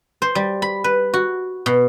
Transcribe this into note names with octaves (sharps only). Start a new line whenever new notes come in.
C5
G3
B5
B4
F#4
B2